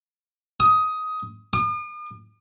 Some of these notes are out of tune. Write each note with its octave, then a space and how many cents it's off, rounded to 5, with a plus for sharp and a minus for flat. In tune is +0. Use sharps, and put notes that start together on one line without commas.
D#6 +15
D#6 -45